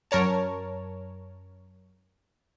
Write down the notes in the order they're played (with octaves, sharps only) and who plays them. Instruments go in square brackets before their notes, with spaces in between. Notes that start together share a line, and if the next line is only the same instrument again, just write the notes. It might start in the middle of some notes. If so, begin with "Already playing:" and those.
[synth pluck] F#2 A#4 C#5 A5